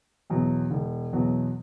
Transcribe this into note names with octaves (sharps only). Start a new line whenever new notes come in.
E2 B2 F#3 B3
E1
E2 B2 F#3 B3